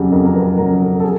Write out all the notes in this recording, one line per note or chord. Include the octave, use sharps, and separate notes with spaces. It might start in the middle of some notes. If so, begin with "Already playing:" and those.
Already playing: F2 C#3 F#3 G4
F2 A#4
A#4
B4
C#3 F#3 A#4
A4
A4
G#4